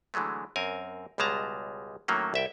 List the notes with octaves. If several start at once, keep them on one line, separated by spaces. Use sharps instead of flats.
D3 E3 F#3 G#3 A3
F#2 C4 A#4 G#5
C#2 B2 G3 G#3 A5 A#5
A2 D#3 F#3 A3 A#3 C#4
C2 E5 G5